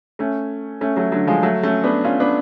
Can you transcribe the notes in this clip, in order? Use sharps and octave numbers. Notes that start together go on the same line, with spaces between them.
A3 C#4
A3 C#4
F#3 A3
D3 F#3
F3 G#3
F#3 A3
A3 C#4
B3 D4
C#4 F4
B3 D4